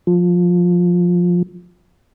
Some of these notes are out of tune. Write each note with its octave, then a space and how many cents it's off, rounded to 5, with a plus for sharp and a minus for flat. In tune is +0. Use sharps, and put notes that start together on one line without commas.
F3 +15